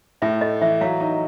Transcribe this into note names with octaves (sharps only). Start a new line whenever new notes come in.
A2 E5
A3 D#5
E3 E5
F#3 F5
D#4